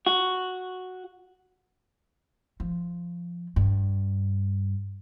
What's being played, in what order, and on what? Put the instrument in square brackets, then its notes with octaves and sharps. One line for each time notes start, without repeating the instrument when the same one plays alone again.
[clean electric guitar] F#4
[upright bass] F3
G2